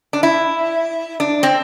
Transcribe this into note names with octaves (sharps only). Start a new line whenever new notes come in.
D4
E4
D4
C4